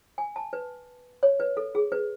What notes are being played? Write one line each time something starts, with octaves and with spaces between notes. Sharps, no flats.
G#5
A5
B4
C#5
B4
A4
G#4
B4